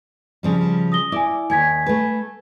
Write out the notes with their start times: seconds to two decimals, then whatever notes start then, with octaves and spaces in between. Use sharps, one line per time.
0.43 C#3 F3 G3
0.92 D#6 A#6 G7
1.12 E4 D5 G#5 D6
1.50 D#2 G#5 G#6 B6
1.86 A3 B4